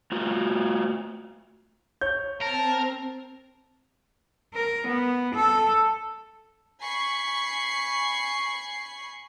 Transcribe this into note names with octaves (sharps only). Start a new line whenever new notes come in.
A3 F4 F#4
C#5 G6
C4 A#4 A5
A#4
B3
A4
G#5 B5 C#6 C7